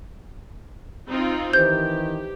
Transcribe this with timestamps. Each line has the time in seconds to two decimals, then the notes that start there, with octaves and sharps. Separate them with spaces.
1.09 C4 D#4 F4
1.53 D#3 E3 G4 C5 G6